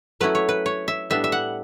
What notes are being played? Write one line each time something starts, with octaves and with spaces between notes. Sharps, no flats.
F#3 A3 C#4 E4 B4
C#5
B4
C#5
E5
A2 G3 B3 D4 E5
E5
F#5